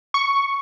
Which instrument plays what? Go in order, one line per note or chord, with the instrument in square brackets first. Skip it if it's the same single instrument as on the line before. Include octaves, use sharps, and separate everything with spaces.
[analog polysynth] C#6